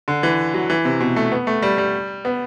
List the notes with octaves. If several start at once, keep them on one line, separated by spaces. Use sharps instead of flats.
D3
E3
F#3
E3
C3
B2
A3
B3
A3
G3
G3
B3